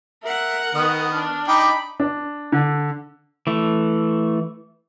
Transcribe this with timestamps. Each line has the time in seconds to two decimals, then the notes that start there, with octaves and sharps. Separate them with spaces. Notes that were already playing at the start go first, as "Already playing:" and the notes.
0.23 A#4 E5 F#5
0.75 D#3 B3 D#6
1.11 D4 F6
1.48 D#4 G5 B5 D6
2.00 D4
2.52 D3
3.47 E3 A3